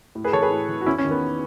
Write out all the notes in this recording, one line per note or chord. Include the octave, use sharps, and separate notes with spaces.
A2
G#4 B4
E3 A4 C#5
G#4 B4
A2
E3
F#4
E2 C#4 E4
C#4
D#3
B3